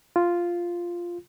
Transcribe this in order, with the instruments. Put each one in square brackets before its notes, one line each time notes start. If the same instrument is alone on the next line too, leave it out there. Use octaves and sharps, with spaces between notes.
[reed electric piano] F4